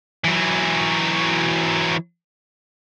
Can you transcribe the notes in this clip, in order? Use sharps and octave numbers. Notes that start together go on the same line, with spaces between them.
E3 F#3